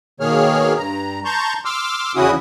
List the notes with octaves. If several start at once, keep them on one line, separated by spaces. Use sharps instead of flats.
B2 D#3 A#3 G#4 C#5 F6
G2 A#5
A5 A#5 C6 C#6 G6
C6 D6 E6 F6
E2 C#3 C#4 E4 F#4 D#6